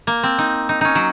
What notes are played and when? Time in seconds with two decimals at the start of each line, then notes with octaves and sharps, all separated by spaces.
0.07 A#3
0.23 C4
0.38 D#4
0.69 D#4
0.81 C#4 D#4
0.95 F#3